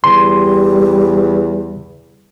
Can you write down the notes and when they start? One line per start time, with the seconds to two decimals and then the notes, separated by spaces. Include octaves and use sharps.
0.04 E2 G3 C6